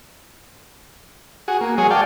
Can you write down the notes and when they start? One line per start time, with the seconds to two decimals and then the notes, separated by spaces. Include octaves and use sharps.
1.48 F#4 G#4
1.61 A#3
1.78 F#3 G#3 G#4 C#5
1.91 D5 F5 G5 A5